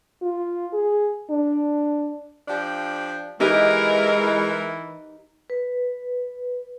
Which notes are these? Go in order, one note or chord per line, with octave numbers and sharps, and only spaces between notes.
F4
G#4
D4
F3 D4 G4
E3 G#3 D#4 G4 A#4 D#5
B4